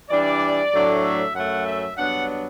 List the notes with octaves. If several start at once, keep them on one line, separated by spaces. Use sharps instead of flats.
E3 G3 D4 D5
A2 F#3 A3 D4
E5
F#2 F#3 A3 F#5
E5
G2 F#3 B3 D4 F#5